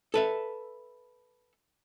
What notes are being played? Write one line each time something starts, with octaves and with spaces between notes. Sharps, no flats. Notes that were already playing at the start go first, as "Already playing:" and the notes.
A4 B4 E5